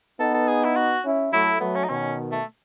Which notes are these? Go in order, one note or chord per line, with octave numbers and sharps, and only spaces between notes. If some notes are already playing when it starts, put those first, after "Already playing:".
B3 D#4 A4
A4
G#4
E4
F#4
C#4 E4
F#3 A3 E4
F#3 A3 B3
C#4
D#4
B2 D#3 C#4
A3